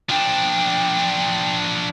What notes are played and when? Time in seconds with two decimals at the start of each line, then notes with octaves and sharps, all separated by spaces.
0.09 F3 D4 G5